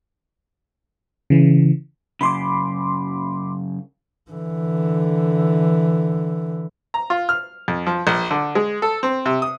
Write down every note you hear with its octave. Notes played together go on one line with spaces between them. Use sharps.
C#3 E3
F#2 C#3 B5 C6 D6
D3 E3
A#5
F4
F6
F2
F3
A#1
D3
G#3
A4
C4
C3
D#6